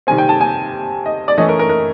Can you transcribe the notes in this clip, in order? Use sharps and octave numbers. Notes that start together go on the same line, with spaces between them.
C3 D#3 G3 C4 G#5
G5
A5
G#5
D#5
D5
E3 A3 C#4 D#5
A#4
A#4
A#4